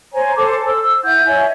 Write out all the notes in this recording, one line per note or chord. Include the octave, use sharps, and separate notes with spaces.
C5 C#5 G#5 A#5
A4 C5 A5 D6
E6
E4 F#5 G6
C#5 D#5 E5 G#5